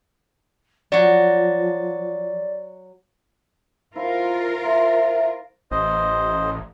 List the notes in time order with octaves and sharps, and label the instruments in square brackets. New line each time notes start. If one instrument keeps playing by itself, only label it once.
[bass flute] F3 [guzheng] F#3 F#4 [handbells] D5
[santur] F3 E4 [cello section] F4 A#4
[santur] C5 [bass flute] E5
[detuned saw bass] A1 [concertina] C5 D#5